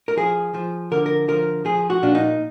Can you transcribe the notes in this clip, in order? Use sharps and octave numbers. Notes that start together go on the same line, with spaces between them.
A#4
F3 G#4
F3
D3 A#4
A#4
F3 A#4
F3 G#4
F#4
A#2 D4
D#4